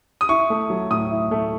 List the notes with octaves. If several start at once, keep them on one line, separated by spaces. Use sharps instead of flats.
D#6
E4 C#6
A3
F#3
A2 D#6
E4
A3